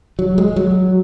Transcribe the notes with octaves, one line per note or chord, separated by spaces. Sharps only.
F#3
G#3
F#3